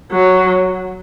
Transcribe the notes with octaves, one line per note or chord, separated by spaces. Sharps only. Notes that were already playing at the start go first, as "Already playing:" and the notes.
F#3